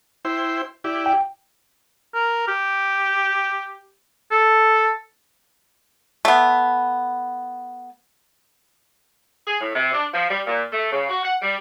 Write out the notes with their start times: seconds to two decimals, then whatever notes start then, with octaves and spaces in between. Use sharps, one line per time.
0.25 E4 C5 G5
0.84 E4 G4 D5
1.06 G5
2.14 A#4
2.48 G4
4.31 A4
6.25 A3 B3
9.47 G#4
9.60 A2
9.74 C3
9.93 D4
10.13 F3
10.30 G3
10.46 A#2
10.72 A3
10.91 C#3
11.09 F#4
11.23 F#5
11.41 G3